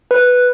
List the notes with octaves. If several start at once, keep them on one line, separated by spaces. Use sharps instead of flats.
B4